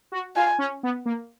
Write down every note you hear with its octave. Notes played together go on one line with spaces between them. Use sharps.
F#4
F4 G#5
C#4
B3
A#3